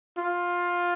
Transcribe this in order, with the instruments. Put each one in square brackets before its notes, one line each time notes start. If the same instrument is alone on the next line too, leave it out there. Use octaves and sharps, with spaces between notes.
[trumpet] F4